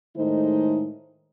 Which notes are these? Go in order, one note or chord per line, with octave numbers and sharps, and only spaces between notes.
A2 D#3 G#3 A3 D#4 C5